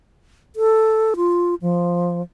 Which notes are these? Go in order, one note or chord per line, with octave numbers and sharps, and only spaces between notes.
A4
F4
F3